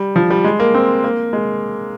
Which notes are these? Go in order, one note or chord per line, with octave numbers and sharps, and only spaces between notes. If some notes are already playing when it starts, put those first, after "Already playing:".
Already playing: G3
F3
G3
G#3
A#3
C4
A#3
G#3